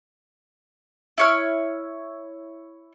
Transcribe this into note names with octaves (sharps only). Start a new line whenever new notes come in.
E4 C#5 F6